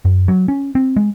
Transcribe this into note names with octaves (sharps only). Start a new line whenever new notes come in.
F#2
F#3
C#4
C4
G#3